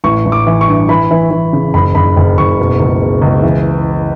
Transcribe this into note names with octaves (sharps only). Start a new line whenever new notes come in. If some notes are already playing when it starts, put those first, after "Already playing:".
A1 C#6
A1
D6
E3
C#6
G2
E3 B5
E3
E3
C#3
F#1 B5
F#1 B5
F#1
F#1 C#6
B2
C#2
B2
C#2
E3